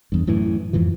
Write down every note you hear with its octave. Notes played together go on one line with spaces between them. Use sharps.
E2 G2
F#2 A2 E3
F2 G#2 E3 F3